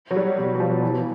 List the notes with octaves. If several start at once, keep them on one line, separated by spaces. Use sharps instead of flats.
F#3
G3
B2 F#3
F#3
F3
E3
E3